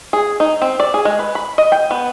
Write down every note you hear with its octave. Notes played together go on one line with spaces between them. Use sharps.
G#4
D#4
C4
D5
G#4
G#3
B4
B5
D#5
G5
B3